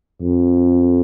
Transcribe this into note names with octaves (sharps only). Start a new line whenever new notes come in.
F2